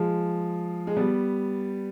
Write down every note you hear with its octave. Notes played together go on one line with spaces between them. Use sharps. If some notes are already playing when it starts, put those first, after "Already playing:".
Already playing: F3 G#3
G#3
G3 B3